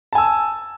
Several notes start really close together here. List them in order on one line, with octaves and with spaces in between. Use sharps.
A5 G#5 E6